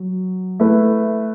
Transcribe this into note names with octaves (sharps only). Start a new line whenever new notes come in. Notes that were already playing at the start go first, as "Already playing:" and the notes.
Already playing: F#3
A3 E4 B4